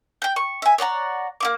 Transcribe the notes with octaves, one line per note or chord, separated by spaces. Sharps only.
G5 G6
C#6
E5 G#5
C#5 D5 F#5 A#5
A#3 E4 D6